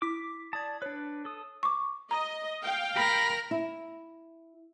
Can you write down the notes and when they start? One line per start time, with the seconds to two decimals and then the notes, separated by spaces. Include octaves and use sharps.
0.02 E4 D6 B6
0.53 D5 A5 D#6 G#6
0.82 D4 B4 C#5
1.25 A4 D#6
1.63 C#6 D6
2.11 D#5 A#5
2.62 F5 G5
2.96 G4 A#4 B5
3.51 E4